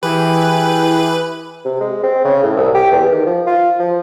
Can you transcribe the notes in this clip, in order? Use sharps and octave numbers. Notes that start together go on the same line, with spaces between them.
E3 E4 G4 G#4 B4
C3
G#3
C4
C#3
A2
C2
G4
E2
D#3
F3
F4
F3